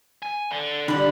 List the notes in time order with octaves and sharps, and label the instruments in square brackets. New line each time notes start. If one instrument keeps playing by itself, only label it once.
[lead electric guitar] G#5
D3
[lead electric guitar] D#2 B5 [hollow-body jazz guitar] D3 [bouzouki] G3 D5